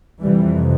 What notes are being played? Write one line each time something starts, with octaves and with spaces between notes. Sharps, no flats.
F2 C3 E3 G3